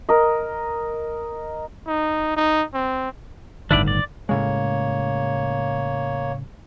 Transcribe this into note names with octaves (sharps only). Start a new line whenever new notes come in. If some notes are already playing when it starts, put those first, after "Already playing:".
A#4 D#5
D#4
D#4
C4
G1 A2 D#3 D4 E4 D5
D5
A2 C#3 G#3 A#3 C#5